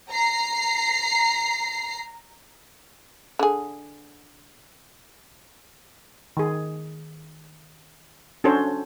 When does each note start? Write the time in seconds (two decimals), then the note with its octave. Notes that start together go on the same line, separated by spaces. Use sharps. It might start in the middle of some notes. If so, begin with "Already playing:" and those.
0.11 A#5 C7
3.39 D3 G#4
6.37 D#3 G#4
8.44 C#4 D4 F#4 A4 C5